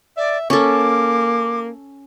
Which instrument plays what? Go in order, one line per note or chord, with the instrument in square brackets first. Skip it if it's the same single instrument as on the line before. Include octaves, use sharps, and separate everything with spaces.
[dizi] D5 [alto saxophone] E5
[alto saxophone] A#3 [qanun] C#4 A4 [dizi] D6